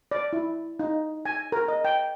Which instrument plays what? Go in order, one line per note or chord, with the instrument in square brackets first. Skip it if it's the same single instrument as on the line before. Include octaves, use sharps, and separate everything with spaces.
[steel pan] D5
E4
D#4
G#5
A#4
D#5
G5